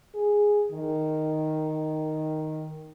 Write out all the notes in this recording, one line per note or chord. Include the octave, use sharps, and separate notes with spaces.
G#4
D#3